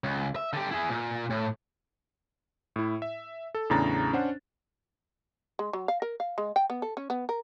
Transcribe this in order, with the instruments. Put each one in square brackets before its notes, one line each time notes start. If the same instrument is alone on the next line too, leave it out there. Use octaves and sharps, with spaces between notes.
[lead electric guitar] C#2
E5
D3 G4
E4 G#4
A#2
A2
[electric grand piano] A2 E4
E5
A4
E2 A2 C#3 D4 A#5 A6
C#4 D4 C5 F#5
[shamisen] G#3
F#3
F5
A#4
F5
G#3
G5
B3
A4
C#4
B3
A#4